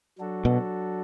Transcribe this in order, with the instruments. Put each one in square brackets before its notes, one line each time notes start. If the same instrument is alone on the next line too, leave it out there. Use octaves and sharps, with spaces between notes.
[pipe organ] F#3 D4 F#4 A4
[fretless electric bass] B2